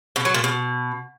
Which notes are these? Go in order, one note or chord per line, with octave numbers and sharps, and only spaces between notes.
B2
F#3
A#2
B2